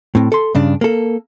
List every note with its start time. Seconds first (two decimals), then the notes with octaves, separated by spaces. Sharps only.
0.15 A2 C4
0.32 A4 C6
0.55 G2 C#3 D4
0.81 A#3 A4